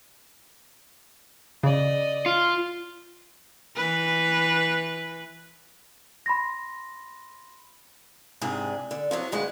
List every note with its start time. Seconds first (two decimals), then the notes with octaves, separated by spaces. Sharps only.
1.63 C#3 D5 D#5
2.26 F4
3.75 E3 B4
6.26 B5 C6 A#6
8.41 G#2 C3 D4 G#4
8.91 D3
9.11 C3 F3 F#3
9.32 D2 G2 G#3 F#5